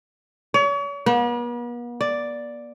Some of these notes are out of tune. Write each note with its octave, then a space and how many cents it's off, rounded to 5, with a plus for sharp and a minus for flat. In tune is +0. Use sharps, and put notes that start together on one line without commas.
C#5 +40
B3 -45
D5 +0